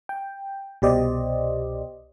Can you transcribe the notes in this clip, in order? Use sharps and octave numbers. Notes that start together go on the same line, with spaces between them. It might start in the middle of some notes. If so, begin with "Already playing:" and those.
G5
C2 B2 G4 C5 D5 D#5